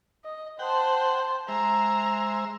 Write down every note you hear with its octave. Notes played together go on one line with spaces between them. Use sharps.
D#5
C5 F#5 G5 A5
G#3 C5 E5 A#5